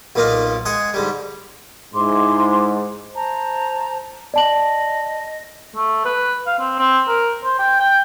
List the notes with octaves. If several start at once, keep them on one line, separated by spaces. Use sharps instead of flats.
B1 A#2 A#3 D#4 F4
G#3 G#4 F#5 D#6
G#2 D3 G3
G#2 E4 C6 D6
C5 A5 A#5
D5 D#5 A5 F#7
A3
B4
F5
C4
C4
A#4
C5
G5
G5